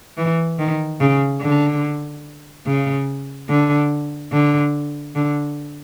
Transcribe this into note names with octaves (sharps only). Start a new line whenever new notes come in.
E3
D#3
C#3
D3
C#3
D3
D3
D3